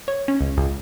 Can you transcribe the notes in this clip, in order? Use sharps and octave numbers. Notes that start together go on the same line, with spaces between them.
C#5
C#4
C#2
C#2